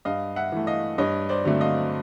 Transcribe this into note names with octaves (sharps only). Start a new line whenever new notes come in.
G2 D#5 F5
E5 F#5
E3 A3
D#5 F5
G2 C#5 D#5
C5 D5
D3 F#3 A3 C4
D#5 F5